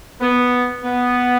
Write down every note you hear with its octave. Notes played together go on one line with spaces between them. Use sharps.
B3
B3